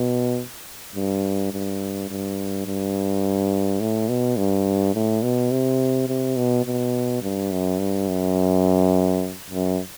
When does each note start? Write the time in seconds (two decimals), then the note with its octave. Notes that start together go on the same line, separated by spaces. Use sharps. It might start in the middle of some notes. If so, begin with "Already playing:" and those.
Already playing: B2
0.96 G2
1.53 G2
2.09 G2
2.66 G2
3.80 A2
4.09 B2
4.37 G2
4.95 A2
5.23 B2
5.51 C3
6.08 C3
6.37 B2
6.65 B2
7.22 G2
7.51 F#2
7.79 G2
8.08 F#2
9.50 F#2